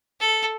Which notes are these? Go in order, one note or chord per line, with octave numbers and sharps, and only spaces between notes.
A4